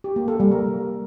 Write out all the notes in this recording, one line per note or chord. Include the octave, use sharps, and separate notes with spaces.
G4
A#3
A4
G3
A#4